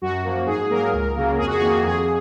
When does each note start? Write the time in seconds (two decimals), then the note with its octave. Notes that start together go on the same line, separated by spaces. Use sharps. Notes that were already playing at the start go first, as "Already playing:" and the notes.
0.02 F#2 F#4
0.24 F3 A#3
0.46 G#2 G#4
0.69 F#3 A#3 A#4
0.93 C#2
1.15 C#3 F#3 A#3
1.38 F2 G#4
1.47 F#4
1.53 G#4
1.61 D#3 A#3 F#4
1.84 F2 G#4